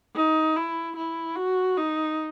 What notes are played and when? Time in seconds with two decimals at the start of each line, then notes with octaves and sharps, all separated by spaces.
0.15 D#4
0.56 E4
0.96 E4
1.36 F#4
1.77 D#4